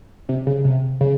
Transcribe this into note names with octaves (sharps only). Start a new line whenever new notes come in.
C3
C#3
C3
C#3